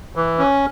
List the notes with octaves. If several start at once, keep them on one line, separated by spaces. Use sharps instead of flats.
E3
C#4